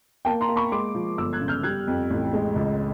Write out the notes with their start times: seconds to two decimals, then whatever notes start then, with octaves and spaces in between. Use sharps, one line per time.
0.25 A#3 G5 A5
0.41 A#5 C6
0.49 A#3
0.56 B5 C#6
0.72 G#3 C6 D6
0.94 F3
1.18 G1 D6 E6
1.33 F#6 G#6
1.41 C#3
1.48 F6 G6
1.63 G3 F#6 G#6
1.87 F2
2.10 A1
2.33 G#3
2.56 C#2